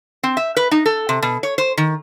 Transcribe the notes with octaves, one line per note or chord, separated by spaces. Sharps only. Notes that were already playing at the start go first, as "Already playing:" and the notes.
C4
E5
B4
D#4
A4
C3
B2
C#5
C5
D#3